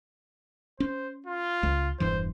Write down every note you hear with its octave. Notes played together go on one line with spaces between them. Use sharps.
C#4 C5
F4
C#2
E1 G2 E3 C5